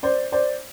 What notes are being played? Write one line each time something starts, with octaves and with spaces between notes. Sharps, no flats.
C5 D5
C5 D5